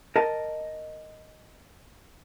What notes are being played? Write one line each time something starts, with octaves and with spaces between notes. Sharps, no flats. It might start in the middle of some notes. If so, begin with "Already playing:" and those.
A#4 D#5 A5